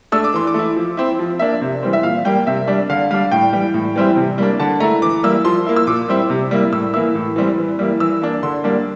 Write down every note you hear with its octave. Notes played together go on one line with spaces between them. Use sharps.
A3 D4 E6
D6
E3 C6
D6
A3 E4
F3
C4 E4
F3
A#3 D4 E5
C3
E3 G3 C4
E5
A#2 F5
G3 A#3 G5
C3 E5
G3 D4
D3 F5
G3 D4 F5
A2 G5
E3 G3
A2
E3 G3 C4 E4
C3
G3 A#3 D4
D3 A5
A3 E4 A#5
E3 D6
G3 A#3 E4 E6
F3 C6
A#3 E4
E6
A#2 D6
G3 C4 E4
C3
G3 A#3 E4
A2 E6
E3 A#3 E4 E6
A2
E3 G3 C4
E3
G3 A#3 E4
E3 E6
A#3 D4
D3 C6
G3 A#3 D4